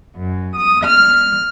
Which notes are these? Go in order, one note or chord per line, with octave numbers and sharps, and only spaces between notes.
F#2
D#6
F6